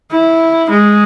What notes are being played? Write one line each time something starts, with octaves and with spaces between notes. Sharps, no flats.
E4
G#3